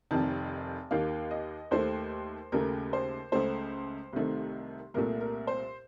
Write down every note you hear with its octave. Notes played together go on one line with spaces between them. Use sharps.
F1 F2 C3 D#3 A5
D#2 D#3 A#3 F5
D#5
D#2 D#3 A3 C5
D#2 C#3 A3 A#4
C5
C#2 C#3 A3 C5
C2 C3 D#3 A3
C2 A#2 A3 A#4
A#4
C5